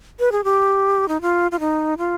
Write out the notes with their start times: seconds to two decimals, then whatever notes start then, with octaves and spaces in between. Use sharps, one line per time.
0.20 B4
0.32 G#4
0.44 G4
1.08 D#4
1.21 F4
1.51 F4
1.60 D#4
1.98 F4